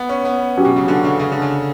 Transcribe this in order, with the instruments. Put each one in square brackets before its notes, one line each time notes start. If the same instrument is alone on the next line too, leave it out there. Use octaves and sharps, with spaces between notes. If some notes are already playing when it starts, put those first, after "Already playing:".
Already playing: [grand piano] B3
C#4
B3
[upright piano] F#3 C#4 G4
[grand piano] B2
C#3
D3
C#3
C#3
D3
C#3